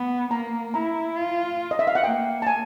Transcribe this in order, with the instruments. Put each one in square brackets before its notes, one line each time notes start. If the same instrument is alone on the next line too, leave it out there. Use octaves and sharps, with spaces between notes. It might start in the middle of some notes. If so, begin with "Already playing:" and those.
Already playing: [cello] B3
[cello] A#3 [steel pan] A#5
[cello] E4 [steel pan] A#5
[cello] F4
[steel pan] D#5
E5
F5
F#5
[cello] A#3 [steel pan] G5
[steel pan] A5
G#5